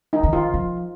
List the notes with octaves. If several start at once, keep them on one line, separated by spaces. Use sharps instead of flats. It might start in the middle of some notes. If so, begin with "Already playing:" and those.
D#4
D#3
F4
F3